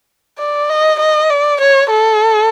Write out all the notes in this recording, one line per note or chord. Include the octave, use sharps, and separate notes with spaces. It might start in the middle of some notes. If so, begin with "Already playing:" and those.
D5
D#5
D#5
D5
C#5
A4